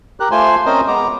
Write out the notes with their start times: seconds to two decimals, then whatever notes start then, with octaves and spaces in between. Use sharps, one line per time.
0.20 G4 A#4 F#6
0.31 A3 F4 C5 G#5 C6
0.66 C4 C#4 A#4 C5 D#5
0.88 G#3 B3 A#5 D6